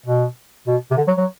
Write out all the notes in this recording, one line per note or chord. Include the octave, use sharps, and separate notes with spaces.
B2
B2
C3
D3
F#3
F#3